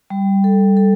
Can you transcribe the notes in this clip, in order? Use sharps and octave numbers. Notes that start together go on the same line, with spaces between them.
G3
A4
A4